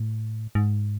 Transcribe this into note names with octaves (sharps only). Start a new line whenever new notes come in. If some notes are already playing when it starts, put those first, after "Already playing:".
Already playing: A2
G#2